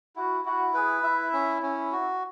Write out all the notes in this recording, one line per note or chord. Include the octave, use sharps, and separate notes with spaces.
E4 F#4
E4 F#4
G#4 B4
E4 E5
C#4
C#4
F#4